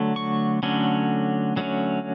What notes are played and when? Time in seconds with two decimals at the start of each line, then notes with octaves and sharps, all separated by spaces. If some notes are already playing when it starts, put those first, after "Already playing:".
Already playing: D3 F#3 A3
0.16 C#6
0.63 D3 F#3 A3 C#4
1.56 D3 F#3 A3 C#4